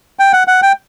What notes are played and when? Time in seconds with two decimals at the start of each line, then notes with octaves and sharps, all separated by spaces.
0.19 G5
0.33 F#5
0.48 F#5
0.62 G5